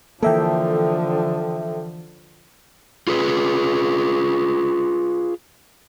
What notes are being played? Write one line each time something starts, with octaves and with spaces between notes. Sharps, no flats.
D3 E3 F3 A#3 A4 E5 G5
F4 G#4 B4